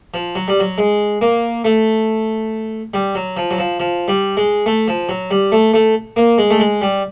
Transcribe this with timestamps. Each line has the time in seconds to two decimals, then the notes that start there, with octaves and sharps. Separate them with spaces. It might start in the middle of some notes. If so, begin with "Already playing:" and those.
0.14 F3
0.35 F#3
0.48 G3
0.60 F#3
0.78 G#3
1.21 A#3
1.64 A3
2.94 G3
3.15 F#3
3.37 F3
3.51 F#3
3.58 F3
3.80 F3
4.08 G3
4.37 G#3
4.66 A3
4.88 F3
5.09 F#3
5.31 G3
5.52 A3
5.74 A3
6.16 A#3
6.38 G#3
6.50 A3
6.59 G#3
6.81 G3